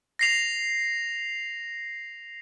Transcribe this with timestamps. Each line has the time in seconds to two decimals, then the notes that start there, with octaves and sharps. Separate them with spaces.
0.19 A#6 C7 F7